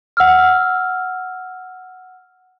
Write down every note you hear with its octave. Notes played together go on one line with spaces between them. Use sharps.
F#5 E6 F6